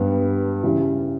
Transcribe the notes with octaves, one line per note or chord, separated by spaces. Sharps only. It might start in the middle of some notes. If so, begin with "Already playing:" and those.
Already playing: G2 G3 B3
C#3 E3 G3